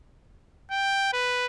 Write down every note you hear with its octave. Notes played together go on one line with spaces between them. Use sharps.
G5
B4